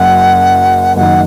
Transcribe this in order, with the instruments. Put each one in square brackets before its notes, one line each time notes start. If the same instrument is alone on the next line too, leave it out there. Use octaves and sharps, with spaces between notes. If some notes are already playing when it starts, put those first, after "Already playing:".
Already playing: [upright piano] F#1 F#2 [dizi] F#5
[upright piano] F#1 F#2 D#3 [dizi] F#5